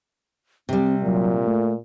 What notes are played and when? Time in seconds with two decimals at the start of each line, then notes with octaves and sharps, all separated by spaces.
0.69 C3 G3 C4
1.03 A#2 F#3
1.44 A3